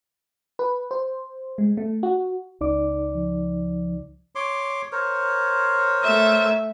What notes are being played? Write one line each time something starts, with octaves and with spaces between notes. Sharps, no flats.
B4
C5
G#3
A3
F#4
C#2 D#4 D5 D6
F3
C#5 C6 D6
A#4 C5 C#5
A3 E5